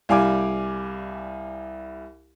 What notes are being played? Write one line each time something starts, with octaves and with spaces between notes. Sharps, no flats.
C2 G3 F5 G#5 D6